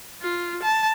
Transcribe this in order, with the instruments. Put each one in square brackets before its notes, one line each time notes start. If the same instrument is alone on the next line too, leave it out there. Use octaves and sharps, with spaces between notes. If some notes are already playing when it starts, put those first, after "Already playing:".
[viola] F4
A5